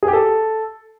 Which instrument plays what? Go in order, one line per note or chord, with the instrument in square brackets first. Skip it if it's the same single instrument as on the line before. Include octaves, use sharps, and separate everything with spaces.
[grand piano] G#4
G4
A4